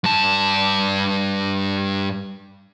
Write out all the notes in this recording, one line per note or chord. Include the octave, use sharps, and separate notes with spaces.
G2 A5